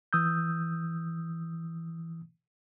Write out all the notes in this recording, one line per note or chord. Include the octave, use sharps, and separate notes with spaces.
E3 D#6 E6 G6